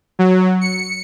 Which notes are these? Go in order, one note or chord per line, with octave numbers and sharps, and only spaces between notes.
F#3
C#7